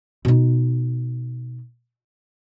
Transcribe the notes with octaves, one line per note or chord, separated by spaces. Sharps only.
B2 D#4